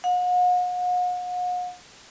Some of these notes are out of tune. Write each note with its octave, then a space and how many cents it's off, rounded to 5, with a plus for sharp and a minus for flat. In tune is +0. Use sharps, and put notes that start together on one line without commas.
F#5 -45